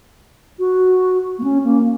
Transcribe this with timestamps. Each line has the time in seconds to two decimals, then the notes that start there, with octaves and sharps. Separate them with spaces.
0.59 F#4
1.39 A#3
1.44 C#4
1.64 A#3